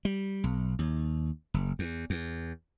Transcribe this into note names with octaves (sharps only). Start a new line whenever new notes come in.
G3
B1
D#2
F#1
E2
E2